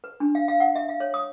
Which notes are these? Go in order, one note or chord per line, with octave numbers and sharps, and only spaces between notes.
B4
D4
F5
F5
F#5
E5
F5
C#5
D#6